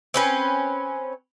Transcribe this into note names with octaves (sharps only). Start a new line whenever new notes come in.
C4 C#4 B4